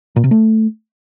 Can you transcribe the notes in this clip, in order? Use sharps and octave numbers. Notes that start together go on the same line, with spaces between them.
A#2
C3
A3